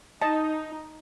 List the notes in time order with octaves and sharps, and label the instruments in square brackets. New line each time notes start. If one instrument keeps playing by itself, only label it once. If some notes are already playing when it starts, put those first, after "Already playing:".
[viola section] D#4 [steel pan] D#5 A5